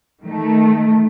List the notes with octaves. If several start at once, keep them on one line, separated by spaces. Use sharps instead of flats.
D#3 A3